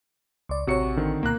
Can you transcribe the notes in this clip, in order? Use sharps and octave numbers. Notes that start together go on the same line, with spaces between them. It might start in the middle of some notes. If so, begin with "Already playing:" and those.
C#2 D5
A1 C3 F#4 C#5 C#7
D3 D#3 C4
C#2 B2 A#3 A#5 F#6